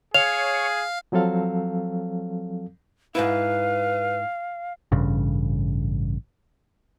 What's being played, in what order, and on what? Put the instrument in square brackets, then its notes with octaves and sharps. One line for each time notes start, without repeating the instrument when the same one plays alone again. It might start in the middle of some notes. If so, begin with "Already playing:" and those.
[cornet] G#4 [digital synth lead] C#5 [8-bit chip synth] F5 [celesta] F7
[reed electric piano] F3 F#3 C4 A4 F5
[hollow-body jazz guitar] G#2 E4 [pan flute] B4 [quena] F5
[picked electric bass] A1 G2 C#3